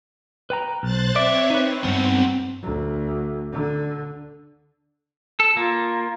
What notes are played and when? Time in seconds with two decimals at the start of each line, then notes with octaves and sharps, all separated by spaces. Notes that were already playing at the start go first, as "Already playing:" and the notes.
0.50 B4 G5 A#5
0.83 B1 C5 F#6 A6
1.16 C4 C#5 D5 E5
1.50 C4 D#4 B4
1.84 E2 G2 B3 D#4
2.63 D2
3.52 D3
5.40 A4
5.57 A#3 F4